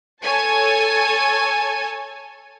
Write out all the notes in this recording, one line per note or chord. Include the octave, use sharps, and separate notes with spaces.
A4 C#5 G#5 A5